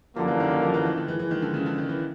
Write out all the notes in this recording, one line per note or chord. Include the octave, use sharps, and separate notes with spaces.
F#2 D3 F3 G3 A#3
E3
D#3
D#3
F3
E3
D#3
D3
G#2 E3 F3 G#3
E3
D#3
D3
C#3
D3
D#3
E3